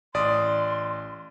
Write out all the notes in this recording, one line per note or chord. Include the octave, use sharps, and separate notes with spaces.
A1 D5 C6 D#6